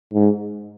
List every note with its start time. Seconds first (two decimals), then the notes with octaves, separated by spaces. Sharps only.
0.14 G#2